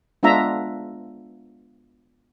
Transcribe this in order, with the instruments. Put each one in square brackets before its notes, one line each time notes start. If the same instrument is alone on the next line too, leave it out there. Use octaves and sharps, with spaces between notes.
[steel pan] G#3 B3 D4 F4 E5 A#5